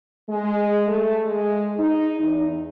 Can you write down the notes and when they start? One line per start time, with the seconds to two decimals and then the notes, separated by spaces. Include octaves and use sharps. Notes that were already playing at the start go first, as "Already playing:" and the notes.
0.28 G#3
0.87 A3
1.25 G#3
1.77 D#4
2.20 E2